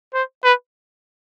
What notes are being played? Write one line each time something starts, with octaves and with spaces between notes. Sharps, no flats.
C5
B4